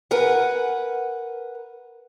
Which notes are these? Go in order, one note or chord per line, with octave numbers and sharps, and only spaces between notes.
A#4 B4 F#5 G#5